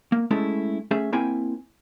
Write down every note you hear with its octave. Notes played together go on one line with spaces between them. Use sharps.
A#3
G#3 A3 C#4 E4 A4
A3 C#4 G#4 E5
A#3 C4 E4 G5 G#5